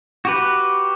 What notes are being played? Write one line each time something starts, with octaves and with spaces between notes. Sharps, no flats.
F#4 G4 B4